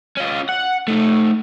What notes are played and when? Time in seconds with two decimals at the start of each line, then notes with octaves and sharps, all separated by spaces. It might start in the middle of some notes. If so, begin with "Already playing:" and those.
0.17 C#4 F4
0.49 F#5
0.88 A3 D#4